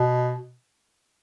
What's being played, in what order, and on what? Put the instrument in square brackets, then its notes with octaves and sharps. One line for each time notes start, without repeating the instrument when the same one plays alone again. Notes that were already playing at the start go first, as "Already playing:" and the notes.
Already playing: [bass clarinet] B2